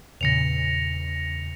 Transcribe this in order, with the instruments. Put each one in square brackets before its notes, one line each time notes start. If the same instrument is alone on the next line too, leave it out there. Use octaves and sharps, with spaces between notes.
[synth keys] E2 A#2 C#3 [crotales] A#6 C#7 F7